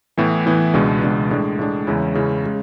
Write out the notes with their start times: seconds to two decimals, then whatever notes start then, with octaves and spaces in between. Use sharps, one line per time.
0.17 A2 E3 B3 E4
0.46 A2 E3 B3 E4
0.74 C#2 B2 G#3 D4
1.02 C#2 B2 G#3 D4
1.31 A2 G#3 D4
1.59 A2 G#3 D4
1.87 E2 C#3 G#3 C#4 E4
2.14 E2 C#3 G#3 C#4 E4
2.46 C#3 G#3